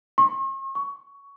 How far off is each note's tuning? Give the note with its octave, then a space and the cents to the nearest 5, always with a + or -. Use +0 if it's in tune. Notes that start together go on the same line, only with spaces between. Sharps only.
C#6 -45
C#6 +15